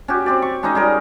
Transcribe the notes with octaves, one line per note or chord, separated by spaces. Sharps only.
C#4 F#4 G4
C4 G4 D5
C#6
G#3 C#4 D#4 D#5
G3 G#4 A#4